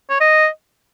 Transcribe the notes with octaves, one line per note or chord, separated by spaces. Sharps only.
C#5
D#5